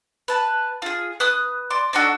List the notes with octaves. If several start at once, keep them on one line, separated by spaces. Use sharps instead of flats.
B4 A5
F4 G#4
B4 D#6 F#6
D5 C6
D4 D#4 F#4 A4